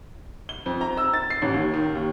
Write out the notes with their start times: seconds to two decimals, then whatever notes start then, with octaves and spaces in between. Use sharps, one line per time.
0.49 G7
0.66 F2
0.81 A#5
0.97 E6
1.13 A6
1.30 C7
1.42 A1
1.54 D#2
1.74 D#3
1.95 D#2